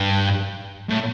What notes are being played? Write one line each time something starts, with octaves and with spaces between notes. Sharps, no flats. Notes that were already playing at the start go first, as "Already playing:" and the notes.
Already playing: G2
A2